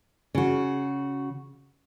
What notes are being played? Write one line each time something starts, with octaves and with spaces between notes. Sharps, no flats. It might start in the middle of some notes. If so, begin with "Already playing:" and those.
C#3 F#4